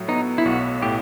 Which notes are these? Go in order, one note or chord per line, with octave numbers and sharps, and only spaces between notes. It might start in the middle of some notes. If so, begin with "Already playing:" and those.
Already playing: A2 F#3
B3 D#4
E4
B1 F#4
A2 G4